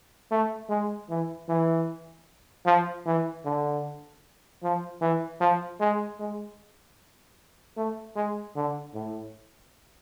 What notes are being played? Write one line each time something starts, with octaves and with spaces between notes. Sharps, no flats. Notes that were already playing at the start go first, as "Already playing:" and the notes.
A3
G#3
E3
E3
F3
E3
D3
F3
E3
F3
G#3
G#3
A3
G#3
D3
A2